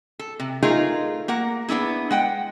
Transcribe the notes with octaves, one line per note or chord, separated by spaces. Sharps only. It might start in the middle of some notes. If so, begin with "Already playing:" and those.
A4
C3
A3 D#4 F4 G#4 A#4
A#3 A#4 F#5
B3 D4 E4 G#4
G#3 F#5 G5